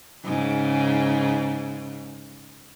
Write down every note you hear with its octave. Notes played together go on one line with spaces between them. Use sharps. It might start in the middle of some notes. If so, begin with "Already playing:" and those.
G#2 C#3